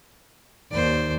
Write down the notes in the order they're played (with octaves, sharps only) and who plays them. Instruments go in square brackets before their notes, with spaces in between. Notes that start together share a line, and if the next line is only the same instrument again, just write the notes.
[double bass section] D#2 [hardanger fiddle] C5 D5